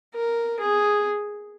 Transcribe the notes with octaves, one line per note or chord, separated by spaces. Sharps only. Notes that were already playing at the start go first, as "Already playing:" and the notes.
A#4
G#4